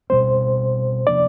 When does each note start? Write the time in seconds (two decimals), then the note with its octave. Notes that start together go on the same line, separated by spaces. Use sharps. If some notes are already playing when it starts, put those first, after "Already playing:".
0.10 B2 G3 C4 C5
1.07 C3 F3 A#3 D4 D5